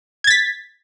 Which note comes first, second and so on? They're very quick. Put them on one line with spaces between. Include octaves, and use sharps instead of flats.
G#6 A6 B6